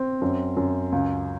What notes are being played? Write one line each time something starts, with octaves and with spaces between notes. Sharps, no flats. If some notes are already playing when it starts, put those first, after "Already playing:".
Already playing: C4
F#2
F#2
C#2